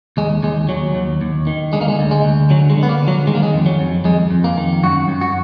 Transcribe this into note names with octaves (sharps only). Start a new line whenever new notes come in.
D#2 G#3
D#2 G#3
D#2 F#3
D#2
D#2
D#3
D3 G#3
A#3
G#3
D2
G#3
D2
D3 F#3
G#3
D3
B3
A#3
D3
F#3
D#3 G#3
A#3
G#3
F2
F#3
F2
F2 G#3
F2
A#3
D#3
F#2 F#4
F#2
F#4